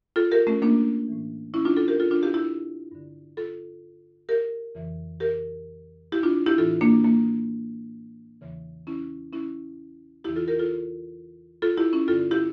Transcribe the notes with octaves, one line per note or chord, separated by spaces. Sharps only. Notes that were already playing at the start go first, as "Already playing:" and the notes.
F4 A4
G4 A#4
A3 C#4
A#3 D4
A2 E3
C#4 E4
D4 F4
F4 A4
G4 A#4
F4 A4
D4 F4
E4 G4
E4 G4
G2 D3
F4 A4
G4 A#4
F2 C#3 E3
G4 A#4
E4 G4
D4 F4
E4 G4
A2 E3 F4 A4
A#3 D4
A#3
E2 C#3 E3
C#4 E4
C#4 E4
E2 C#3 E3 E4 G4
F4 A4
G4 A#4
F4 A4
F4 A4
E4 G4
C#4 E4
G2 D3 F4 A4
E4 G4